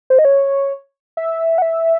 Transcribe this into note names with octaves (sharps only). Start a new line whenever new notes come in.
C5
D#5
C#5
E5
F#5
E5